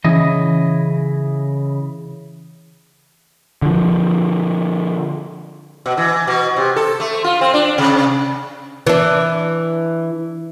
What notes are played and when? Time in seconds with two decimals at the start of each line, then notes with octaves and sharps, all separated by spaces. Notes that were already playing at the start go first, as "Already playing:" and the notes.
0.04 C#3 E3 E4 D#5
3.62 D3 F3
5.86 B2
5.97 E3
6.28 B2
6.56 C3
6.76 A4
7.00 A3
7.24 F4
7.41 C4
7.54 D4
7.78 C3
8.87 E3 D4